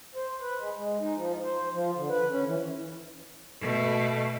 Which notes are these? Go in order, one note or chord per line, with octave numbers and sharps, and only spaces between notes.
C5
B4
G#3
G#3
D#4
F3
C5
F3
D3
B4
C#4
E3
B2 A3